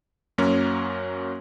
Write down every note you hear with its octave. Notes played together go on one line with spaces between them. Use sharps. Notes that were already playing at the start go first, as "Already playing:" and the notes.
F#2 F#3 A#3 C#4